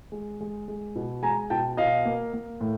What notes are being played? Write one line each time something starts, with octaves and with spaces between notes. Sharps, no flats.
G#3
G#3
G#3
B2
G#3 G#5 A#5
B2 G5 A5
B2 D#5 F5
A#3
A#3
A2